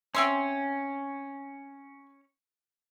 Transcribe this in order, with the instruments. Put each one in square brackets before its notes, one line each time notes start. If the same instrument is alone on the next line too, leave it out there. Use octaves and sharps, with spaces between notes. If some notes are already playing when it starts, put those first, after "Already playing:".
[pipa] C4 E5 C6 [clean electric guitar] C#4